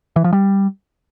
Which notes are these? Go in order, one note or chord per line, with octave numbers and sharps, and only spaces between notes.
E3
F3
G3